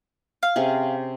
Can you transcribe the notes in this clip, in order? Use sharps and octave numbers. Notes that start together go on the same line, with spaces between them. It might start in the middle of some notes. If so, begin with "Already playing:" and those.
F5
C3 C#4 G#4